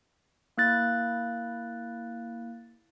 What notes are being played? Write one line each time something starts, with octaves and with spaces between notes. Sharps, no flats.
A#3 E4 F#6 A6